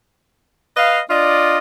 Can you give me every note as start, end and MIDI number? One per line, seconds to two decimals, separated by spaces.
0.76 1.00 71
0.76 1.00 75
0.76 1.00 77
1.10 1.58 62
1.10 1.58 65
1.10 1.58 74
1.10 1.58 75